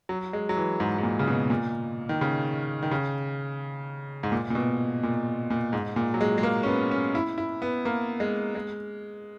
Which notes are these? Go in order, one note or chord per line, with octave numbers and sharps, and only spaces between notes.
F#3
G#3
F#3
E3
G#2
G#2
A#2
C#3
B2
A#2
D#3
C#3
D#3
C#3
G#2
A#2
A#2
B2
A#2
A#2
G#2
A#2
F#3
G#3
G#3
A#3
C#4
B3
C#4
E4
E4
B3
A#3
G#3
G#3